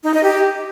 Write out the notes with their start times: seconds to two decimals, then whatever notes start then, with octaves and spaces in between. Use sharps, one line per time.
0.04 D#4
0.14 D#5
0.23 G4